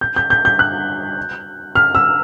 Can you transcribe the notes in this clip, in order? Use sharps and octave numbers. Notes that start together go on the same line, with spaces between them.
G6
G6
G6
G6
F#6
F6
E6